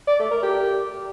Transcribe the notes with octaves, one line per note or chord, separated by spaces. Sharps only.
D5
A3
A#4
G4